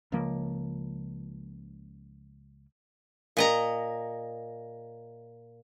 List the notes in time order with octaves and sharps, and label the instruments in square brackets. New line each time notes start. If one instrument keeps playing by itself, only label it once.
[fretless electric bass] C#2 C#3 F3 A#3
[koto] A#2 D#5 A#5